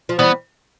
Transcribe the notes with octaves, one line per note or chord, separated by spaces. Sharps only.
F3
E3 G3 B3